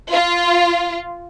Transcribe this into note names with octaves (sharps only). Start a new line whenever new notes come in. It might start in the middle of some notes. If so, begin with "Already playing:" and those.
F4